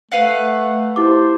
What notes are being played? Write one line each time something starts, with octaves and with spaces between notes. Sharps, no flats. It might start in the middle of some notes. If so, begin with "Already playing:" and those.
A3 B4 F5 F#5
E4 G4 C5 D6